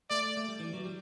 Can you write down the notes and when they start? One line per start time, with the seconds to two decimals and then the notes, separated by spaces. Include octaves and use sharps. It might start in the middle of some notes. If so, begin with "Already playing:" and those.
0.10 A3 D5
0.37 A3
0.48 G3
0.60 E3
0.73 F#3
0.85 G3